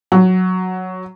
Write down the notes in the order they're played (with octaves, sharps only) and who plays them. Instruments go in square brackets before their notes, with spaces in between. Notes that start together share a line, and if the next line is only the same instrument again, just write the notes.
[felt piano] F#3